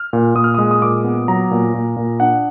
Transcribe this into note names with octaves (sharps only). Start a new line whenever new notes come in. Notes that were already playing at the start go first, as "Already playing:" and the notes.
Already playing: F6
A#2
A#2 D#6
F6
G#3 D#6
D#6
A#2 D6
B3
F#3 A#5
A#2
A#2
A#2
D4 F#5